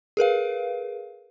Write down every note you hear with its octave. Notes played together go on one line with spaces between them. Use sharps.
G#4 A#4 B4 F5